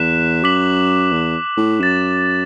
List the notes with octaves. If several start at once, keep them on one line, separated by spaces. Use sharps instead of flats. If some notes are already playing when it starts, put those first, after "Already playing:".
Already playing: E2 F#6 B6 E7
F#2 D6 B6 F#7
E2
A2
F#2 A6 E7